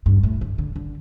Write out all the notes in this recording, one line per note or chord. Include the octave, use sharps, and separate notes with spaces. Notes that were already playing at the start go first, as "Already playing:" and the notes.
G2
A2
D3
D3
D3